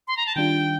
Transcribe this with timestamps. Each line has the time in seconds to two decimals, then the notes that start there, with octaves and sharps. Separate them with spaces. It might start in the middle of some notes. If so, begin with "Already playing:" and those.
0.08 C6
0.17 A#5
0.26 A5
0.35 D#3 G3 D4 F4 G5